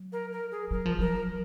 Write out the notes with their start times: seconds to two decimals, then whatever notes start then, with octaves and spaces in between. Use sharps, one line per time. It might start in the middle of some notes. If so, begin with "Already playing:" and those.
Already playing: F#3
0.13 A#4
0.32 A#4
0.51 G#4
0.71 F#3 A#4
0.86 F3
0.99 F#3 A#4